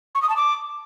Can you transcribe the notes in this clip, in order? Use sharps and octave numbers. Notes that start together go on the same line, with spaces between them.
C#6
D#6
A5
D6